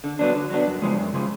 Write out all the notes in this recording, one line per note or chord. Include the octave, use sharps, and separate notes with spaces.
D3
F#3 B3 D4
D3
F#3 B3 D4
F#2
C#3 F3 G#3
F#2
C#3 F3 G#3